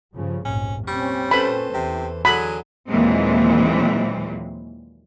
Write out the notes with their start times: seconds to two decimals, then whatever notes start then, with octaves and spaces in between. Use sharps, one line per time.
0.15 G2 C#3 F3
0.45 F1 A#1 G#2 C#4
0.88 A#2 G3 C4 C#4 C#6
1.31 A4 B4 C5 B5
1.74 E2 C3 E3
2.25 D3 F#3 G#4 B5
2.89 D#2 A#2 E3 F#3 G#3 C4